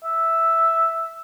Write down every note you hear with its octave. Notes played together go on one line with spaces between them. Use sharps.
E5